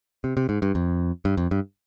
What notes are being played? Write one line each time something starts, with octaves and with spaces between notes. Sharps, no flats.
C3
C3
G#2
G2
F2
G2
F2
G2